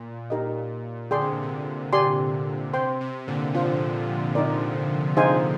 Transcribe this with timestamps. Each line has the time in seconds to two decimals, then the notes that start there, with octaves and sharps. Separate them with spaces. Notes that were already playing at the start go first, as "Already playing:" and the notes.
Already playing: A#2
0.30 D#4 G4 A#4 D#5
1.11 D3 G#4 D5 G5 C6
1.21 C3
1.32 A#2
1.43 C3
1.93 G4 D5 G#5 C6
2.73 C3 C5 G5 C6
3.01 C3
3.28 A#2 D3
3.54 D3 F3 D4 F4 C5 F5
4.35 D#4 A#4 D5
5.17 D#4 G#4 C5 F5 G#5